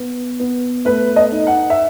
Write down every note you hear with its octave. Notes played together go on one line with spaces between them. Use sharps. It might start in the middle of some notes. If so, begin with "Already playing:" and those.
Already playing: B3
B3
A3 B4
D#5
D#4
F#5
E5